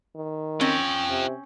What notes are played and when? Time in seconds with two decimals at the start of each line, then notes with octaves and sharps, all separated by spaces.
0.15 D#3
0.61 C4 C#4 F4 G5
1.09 C3